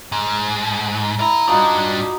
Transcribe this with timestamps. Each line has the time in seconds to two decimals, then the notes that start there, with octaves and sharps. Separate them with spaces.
0.12 G#2
1.20 E4 D5 A#5
1.48 G2 D4 D#4 F4 F#4